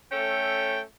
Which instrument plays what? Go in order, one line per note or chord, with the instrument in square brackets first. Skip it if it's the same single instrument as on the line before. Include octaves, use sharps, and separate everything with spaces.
[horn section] A3 C#4 A4 G5